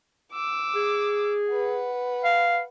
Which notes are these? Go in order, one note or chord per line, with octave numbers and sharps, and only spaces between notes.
D6 E6
G#4
B4 F#5
F5